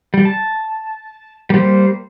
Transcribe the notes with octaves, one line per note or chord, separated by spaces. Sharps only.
G3
A5
G3 A#3 C5